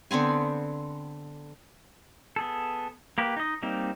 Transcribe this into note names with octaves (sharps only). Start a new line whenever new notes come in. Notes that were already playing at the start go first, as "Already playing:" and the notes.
D3 B3 C4 G#5
B3 G#4 A4
A#3 G4 B4
D#4 D#5
G3 A#3 C4 D#4